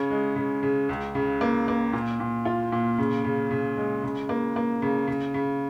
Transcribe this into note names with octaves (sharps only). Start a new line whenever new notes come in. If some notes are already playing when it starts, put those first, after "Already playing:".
Already playing: C#3 C#4
G#3
C#3
C#3
C#2
C#3
A#3
A#3
A#2
A#2
F4
A#2
C#3
C#3
C#3
G#3
C#3
A#3
A#3
C#3
C#3
C#3